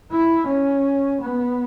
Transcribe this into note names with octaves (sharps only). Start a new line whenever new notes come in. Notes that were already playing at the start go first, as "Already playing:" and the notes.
E4
C#4
B3